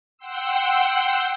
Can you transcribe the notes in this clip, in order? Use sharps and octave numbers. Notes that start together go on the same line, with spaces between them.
F#5 G5 C6 E6